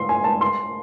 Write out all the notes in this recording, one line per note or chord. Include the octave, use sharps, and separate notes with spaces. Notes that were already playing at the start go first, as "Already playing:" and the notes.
Already playing: C6
G#5
A5
C6